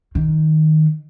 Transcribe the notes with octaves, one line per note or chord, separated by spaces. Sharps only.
D#3